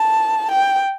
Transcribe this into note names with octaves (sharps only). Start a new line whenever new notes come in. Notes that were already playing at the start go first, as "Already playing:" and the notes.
Already playing: A5
G5